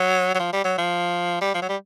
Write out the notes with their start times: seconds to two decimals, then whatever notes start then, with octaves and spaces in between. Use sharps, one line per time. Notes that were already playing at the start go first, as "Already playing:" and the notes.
Already playing: F#3
0.34 F#3
0.39 F3
0.52 G3
0.64 F#3
0.78 F3
1.41 G3
1.54 F3
1.61 F#3
1.69 G3